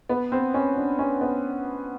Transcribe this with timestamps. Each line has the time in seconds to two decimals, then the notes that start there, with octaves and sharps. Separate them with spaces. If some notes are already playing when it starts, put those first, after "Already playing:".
0.09 B3
0.32 C4
0.54 C#4
0.77 D4
0.99 C#4
1.21 B3